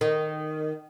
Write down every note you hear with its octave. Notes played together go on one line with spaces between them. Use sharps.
D#3